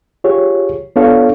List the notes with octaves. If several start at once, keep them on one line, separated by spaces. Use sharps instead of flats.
F4 G4 G#4 C#5
B3 D4 F4 A4 C#5 F5